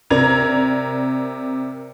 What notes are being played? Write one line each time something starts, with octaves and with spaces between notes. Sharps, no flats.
C3 A#4 D5 A#5 G#6 F7